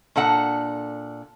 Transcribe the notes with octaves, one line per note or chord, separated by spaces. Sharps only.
A#2 D4 A4 F#5